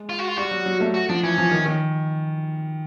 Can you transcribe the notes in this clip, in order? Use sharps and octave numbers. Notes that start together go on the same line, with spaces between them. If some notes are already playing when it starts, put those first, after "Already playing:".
Already playing: G#3
F4
F#4
F4
G3 F#4
F#3
F#3
A3
F#4
F3 D4
E3 C#4
F3
D#3
D#3